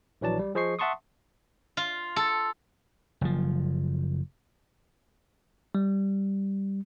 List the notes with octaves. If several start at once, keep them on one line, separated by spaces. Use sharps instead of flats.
A#1 E3 F#3 D5 A5
G3
F3 G#4 C5 D#5 C#6 C7
E5 F#5 A5 C6 C#6 D#6
F4
A4
F#1 F3
G3